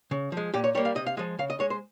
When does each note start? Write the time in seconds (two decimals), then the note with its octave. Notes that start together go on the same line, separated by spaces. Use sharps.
0.11 C#3
0.32 F3 G#3
0.54 A#2 G4
0.64 C#5
0.75 G3 A#3 C#5
0.85 F5
0.96 C3 D#5
1.07 F5
1.17 F3 G#3 D#5
1.39 C#3 F5
1.50 D#5
1.60 G#3 C#5
1.70 C5